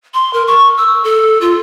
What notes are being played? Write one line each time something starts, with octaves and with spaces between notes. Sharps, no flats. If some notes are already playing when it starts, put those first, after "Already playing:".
C6
A#4
C#6
E6
A4
F4